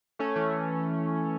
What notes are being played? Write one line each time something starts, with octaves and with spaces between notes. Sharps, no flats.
A3 C#4
E3 A3
E3